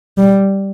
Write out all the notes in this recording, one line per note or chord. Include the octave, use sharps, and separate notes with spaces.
G3